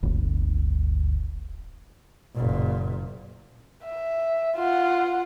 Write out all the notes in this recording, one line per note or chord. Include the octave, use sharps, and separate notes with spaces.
D1 G1 D2
F#1 A#2
E5
F4 F#5